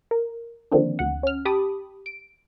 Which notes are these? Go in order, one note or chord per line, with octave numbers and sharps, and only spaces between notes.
A#4
D3 D#3 F3 A#3 C4 D4
D2 F#5
C#4 F6
G4 A5 B5 D6 D#6
D7